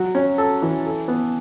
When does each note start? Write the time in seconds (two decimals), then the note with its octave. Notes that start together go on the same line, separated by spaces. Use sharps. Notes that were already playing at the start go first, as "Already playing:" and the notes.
Already playing: F#3 F#4
0.15 C#4
0.38 A4
0.62 E3
0.86 A4
1.08 B3